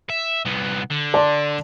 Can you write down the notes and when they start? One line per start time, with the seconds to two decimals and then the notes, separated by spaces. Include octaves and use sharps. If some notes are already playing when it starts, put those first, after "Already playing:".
0.10 E5
0.45 C2 B3
0.90 D3
1.14 D5 A5 C6